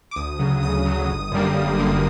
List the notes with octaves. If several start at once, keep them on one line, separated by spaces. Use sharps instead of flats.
D6
D2 D#6
C#3 F#3
D2 D#6
C#3 F#3
G1
F#2 D3 G3 A#3
G1
F#2 D3 G3 A#3